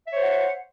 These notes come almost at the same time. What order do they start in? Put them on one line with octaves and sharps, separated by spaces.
E5 C#5 C5 F#5